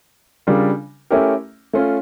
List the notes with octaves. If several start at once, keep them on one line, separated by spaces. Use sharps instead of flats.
C#3 G3 D4 F4 A#4
A3 C#4 E4 G4 A#4
A3 C#4 F4